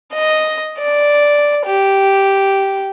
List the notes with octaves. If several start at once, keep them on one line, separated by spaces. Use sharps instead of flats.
D#5
D5
G4